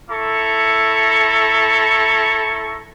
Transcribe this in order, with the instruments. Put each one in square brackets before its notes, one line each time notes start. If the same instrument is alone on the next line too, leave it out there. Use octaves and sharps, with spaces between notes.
[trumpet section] E4 A4 A#5 C#6